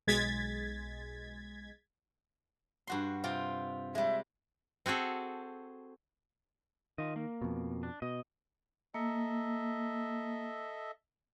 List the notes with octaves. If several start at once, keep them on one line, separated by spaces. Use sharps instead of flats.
B1 G#3 G#6 A6 B6
G2 F#4 C6
C3 F4 G5
G3 G#3 E5
C4 F#4 G#4 A4
D#3 F4 D#5
A#3
F2 B2
D4
B2 D#5
A#3 A4 D#5 E5